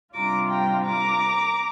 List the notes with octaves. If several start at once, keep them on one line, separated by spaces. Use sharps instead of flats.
C3 G3 D4 F4 A#5 D6
G5 A#5
A#5 D6